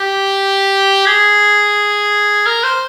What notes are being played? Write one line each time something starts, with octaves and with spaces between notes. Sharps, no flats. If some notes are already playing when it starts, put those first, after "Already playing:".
Already playing: G4
G#4
A#4
C5